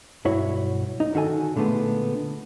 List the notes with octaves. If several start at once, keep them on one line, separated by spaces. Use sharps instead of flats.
B1 G2 E4 F#4 C#5
D#4
D3 D#3 F#4 A4 G#5
A#2 D3 G#3 A3 B3